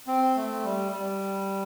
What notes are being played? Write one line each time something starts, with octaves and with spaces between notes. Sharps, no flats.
C4
A3
G3
G3